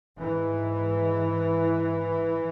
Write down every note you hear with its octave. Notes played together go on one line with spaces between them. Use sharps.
G#2 E3